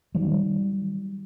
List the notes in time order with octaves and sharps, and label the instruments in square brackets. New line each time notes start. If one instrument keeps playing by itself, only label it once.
[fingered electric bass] D#3 F#3 G3